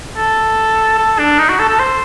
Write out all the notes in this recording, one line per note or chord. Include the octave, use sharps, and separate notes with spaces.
A4
A4
D4
D#4
F#4
A4
A4
C5